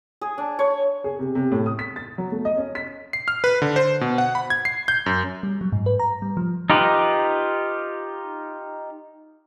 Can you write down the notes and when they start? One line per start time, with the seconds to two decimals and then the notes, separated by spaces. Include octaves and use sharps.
0.21 G#4
0.38 D4
0.59 C#5
1.04 G#4
1.19 C3
1.35 C3
1.52 A2
1.66 D#6
1.79 B6
1.96 A6
2.18 F#3
2.32 A3
2.45 D#5
2.57 C#4
2.75 B6
3.13 C7
3.28 F6
3.44 B4
3.62 D3
3.76 C5
4.01 B2
4.18 F#5
4.35 B5
4.50 G#6
4.65 C7
4.88 G6
5.06 F#2
5.43 G3
5.61 F#3
5.72 G#2
5.86 B4
5.99 A#5
6.22 G3
6.37 F3
6.70 D#4 F4 G4 B4